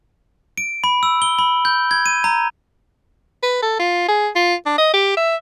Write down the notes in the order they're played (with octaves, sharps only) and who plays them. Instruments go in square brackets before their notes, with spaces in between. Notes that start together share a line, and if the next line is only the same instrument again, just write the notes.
[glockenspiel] D7
B5
E6
G7
B5
G6
G#6
D#7
A#5
[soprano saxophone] B4
A4
F4
G#4
F4
D4
D#5
G4
E5